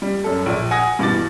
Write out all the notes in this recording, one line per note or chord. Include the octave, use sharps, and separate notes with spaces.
G3
F#2 A4
A#1 D5
F#5 G#5 D#6 A#6
G2 B2 E3 D6 A6